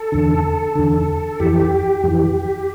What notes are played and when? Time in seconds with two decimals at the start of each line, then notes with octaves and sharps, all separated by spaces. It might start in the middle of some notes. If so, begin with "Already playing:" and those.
Already playing: A4
0.12 E2 D3
0.75 E2 D3
1.40 F2 E3 G4
2.04 F2 E3